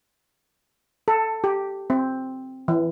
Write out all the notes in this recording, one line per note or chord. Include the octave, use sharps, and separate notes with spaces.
A4
G4
C4
E3